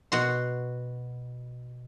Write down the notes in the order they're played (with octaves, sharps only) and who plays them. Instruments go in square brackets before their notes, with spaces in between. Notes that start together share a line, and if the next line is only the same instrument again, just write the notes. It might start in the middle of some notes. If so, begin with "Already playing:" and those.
[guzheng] B2 F#4 C6